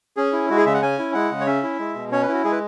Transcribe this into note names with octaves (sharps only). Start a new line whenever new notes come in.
C#4 G#4
E4
G#3 F#4
G#4
C#3 E5
F#5
C#4 G#5
E4
G#3 F#5
C#3
C#5
C#4 E5
E4
G#3
B2
C#4 C#5
B4
E4 F#4
G#3 G#4
B4